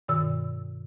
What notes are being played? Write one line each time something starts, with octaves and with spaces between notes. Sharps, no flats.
G2 B2 D#3 E6